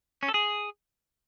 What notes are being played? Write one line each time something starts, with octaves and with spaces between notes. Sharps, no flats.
C#4
A4
G#4